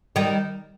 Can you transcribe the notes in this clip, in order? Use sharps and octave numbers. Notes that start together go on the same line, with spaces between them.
D#3 G3